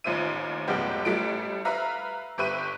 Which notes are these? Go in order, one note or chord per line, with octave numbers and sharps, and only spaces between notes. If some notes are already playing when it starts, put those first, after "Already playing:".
A1 D#2 F4 C5 E5 D#7
F1 B1 G#3 B3 G4
A1 G3 A3 E4 D7
B4 E5 F5 A#5
G1 G4 B4 E5 C#6 D#7